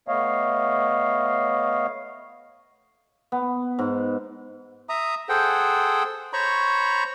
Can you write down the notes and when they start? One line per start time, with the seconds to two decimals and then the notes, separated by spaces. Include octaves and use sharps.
0.08 A3 B3 C#5 D#5 F5
3.32 B3
3.79 G#2
4.89 E5 A#5 D#6
5.29 G#4 A4 C5 F#5 G5
6.33 C5 C#5 A#5 B5 C#6